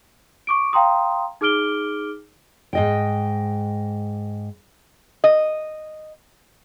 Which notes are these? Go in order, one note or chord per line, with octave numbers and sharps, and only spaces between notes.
C#6 D6 D7
F5 G5 A#5 C6 D#6
D#4 G#4 D6 F6 D7 G7
G#2 D#5 G5
D#5